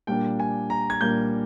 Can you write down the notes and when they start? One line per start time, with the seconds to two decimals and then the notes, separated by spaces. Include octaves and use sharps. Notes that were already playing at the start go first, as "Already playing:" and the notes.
0.07 A#2 G3 A#3 D4 G5
0.40 G#5
0.70 A#5
0.90 G#6
1.01 A#2 G3 A#3 D4 G6